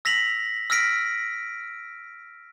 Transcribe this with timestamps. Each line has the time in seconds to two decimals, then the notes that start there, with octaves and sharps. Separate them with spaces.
0.05 E6 A#6 B6 F7 F#7
0.70 E6 F6 A#6 B6 D7